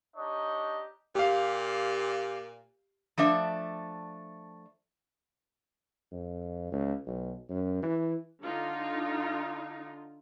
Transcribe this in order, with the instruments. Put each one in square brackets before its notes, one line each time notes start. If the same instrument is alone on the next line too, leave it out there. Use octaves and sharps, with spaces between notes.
[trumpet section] D4 D#4 G4 C#5 D#5
[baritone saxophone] A#2 [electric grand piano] G4 F5
[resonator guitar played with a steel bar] F3 A3 D4 E5
[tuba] F2
C#2
B1
F#2
E3
[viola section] D3 D#4 F4